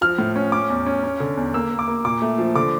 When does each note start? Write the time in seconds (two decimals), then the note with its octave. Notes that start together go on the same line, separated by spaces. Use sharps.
0.01 F3 F6
0.18 A2
0.36 C#4
0.52 C#4 D6
0.70 E2
0.86 C#4
1.04 C#4
1.20 D3
1.37 E2
1.54 A#3 E6
1.71 A#3
1.79 D6
1.88 A#3
2.04 A#2 D6
2.22 A3
2.38 F3
2.55 D3 D6